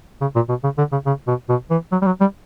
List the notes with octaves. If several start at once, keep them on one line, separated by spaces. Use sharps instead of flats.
C#3
A#2
B2
C#3
D3
C#3
C#3
B2
B2
E3
F#3
G3
F#3
G3